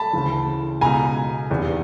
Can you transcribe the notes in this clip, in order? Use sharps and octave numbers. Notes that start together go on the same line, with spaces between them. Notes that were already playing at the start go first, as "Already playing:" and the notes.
Already playing: A5 B5
D2 C#3 E3
C#2 B2 G#5 A#5
F1 E2 C3